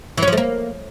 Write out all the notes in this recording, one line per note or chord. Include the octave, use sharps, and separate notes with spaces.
E3
C#4
F3
A3
A#3